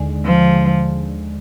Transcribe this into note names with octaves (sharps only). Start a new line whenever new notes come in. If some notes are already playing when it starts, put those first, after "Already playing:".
Already playing: D#2 D3 G#3
F3